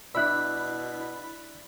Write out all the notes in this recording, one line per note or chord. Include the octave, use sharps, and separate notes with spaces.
B2 D4 E4 D5 E5 B5 E6 F#6